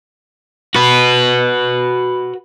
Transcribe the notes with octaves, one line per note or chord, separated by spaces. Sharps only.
F#4 B4